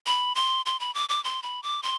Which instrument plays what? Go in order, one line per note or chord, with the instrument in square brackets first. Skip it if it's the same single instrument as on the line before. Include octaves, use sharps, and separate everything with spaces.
[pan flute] B5
C6
C6
B5
D6
D6
C6
B5
D6
C6